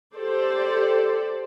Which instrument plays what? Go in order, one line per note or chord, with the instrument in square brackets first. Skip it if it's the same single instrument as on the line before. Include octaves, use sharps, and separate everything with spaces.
[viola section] G4 A4 C5 D5